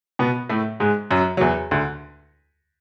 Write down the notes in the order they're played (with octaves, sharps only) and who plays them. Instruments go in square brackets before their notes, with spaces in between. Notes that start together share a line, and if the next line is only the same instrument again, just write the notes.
[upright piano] B2 B3
A2 A3
G#2 G#3
F#2 F#3
F#3
E2 E3
D2 D3